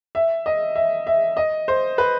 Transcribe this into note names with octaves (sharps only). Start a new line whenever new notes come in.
E5
D#5
E5
E5
D#5
C5
B4